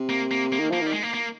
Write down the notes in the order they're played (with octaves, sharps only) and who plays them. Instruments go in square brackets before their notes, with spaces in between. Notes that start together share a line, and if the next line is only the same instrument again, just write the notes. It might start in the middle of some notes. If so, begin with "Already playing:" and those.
Already playing: [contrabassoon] C3
[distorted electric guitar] A#3
A#3
A#3
[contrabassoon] D#3
[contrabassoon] F3 [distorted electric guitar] A#3
[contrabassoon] D#3 [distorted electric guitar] G3
[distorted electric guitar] G#3
A#3
A#3